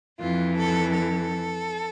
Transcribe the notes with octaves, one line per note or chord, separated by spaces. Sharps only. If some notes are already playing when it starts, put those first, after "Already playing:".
F2 E3 F4
A4
A4